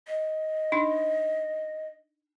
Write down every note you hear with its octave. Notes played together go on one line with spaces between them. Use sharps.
D#5
D4 D#4